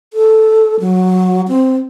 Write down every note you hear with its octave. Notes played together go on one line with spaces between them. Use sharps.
A4
F#3
C4